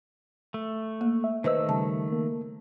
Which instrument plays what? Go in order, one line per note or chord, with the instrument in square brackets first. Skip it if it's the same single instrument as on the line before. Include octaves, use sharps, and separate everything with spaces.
[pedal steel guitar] A3
[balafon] A#3
[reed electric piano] E5
[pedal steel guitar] D#3 A3 E6 [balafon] B4 C5 D#5
[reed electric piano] C#3 G3 [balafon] A5
[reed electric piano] A#3